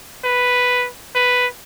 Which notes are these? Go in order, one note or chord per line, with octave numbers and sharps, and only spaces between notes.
B4
B4